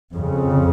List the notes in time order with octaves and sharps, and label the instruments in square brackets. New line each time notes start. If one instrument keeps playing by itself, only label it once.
[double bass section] F2 C#3